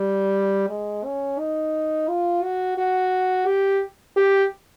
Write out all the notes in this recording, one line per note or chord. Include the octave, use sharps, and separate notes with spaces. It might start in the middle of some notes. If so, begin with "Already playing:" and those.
Already playing: G3
G#3
C#4
D#4
F4
F#4
F#4
G4
G4